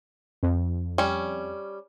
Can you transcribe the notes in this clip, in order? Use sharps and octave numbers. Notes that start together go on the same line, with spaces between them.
F2
G3 C#4